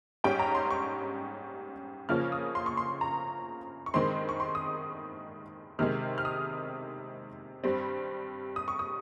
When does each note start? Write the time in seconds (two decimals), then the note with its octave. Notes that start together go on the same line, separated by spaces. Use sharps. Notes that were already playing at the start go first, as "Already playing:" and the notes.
0.24 G#2 G3 C#4 G5
0.39 A#5
0.55 C6
0.71 C#6
2.09 C#3 F3 A#3 C#4 F6
2.32 D#6
2.55 C6
2.66 C#6
2.77 C6
3.01 A#5
3.86 C#6
3.94 G2 D#3 G#3 C4 C6
4.29 C#6
4.40 C6
4.55 D#6
5.79 C3 D#3 G#3 F6
6.18 F6
6.25 D#6
7.64 G2 G3 C4
8.56 D#6
8.68 C#6
8.79 D#6